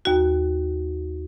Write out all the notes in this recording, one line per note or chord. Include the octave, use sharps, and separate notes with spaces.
D#2 F#4